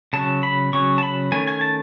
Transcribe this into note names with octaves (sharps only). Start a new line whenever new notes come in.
C#3 F#3 C#4 A5
B5
C#3 F#3 C#4 C#6
A5
B5
D#3 A3 C#4 G#5
G#5
A5